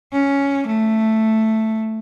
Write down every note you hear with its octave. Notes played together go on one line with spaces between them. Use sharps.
C#4
A3